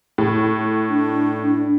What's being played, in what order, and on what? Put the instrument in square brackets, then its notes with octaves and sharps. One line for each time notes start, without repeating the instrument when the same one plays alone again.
[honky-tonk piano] A2
[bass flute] D4